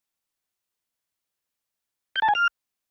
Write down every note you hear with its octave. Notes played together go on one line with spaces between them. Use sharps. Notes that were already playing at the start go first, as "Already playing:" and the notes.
G6
A5
G#5
F6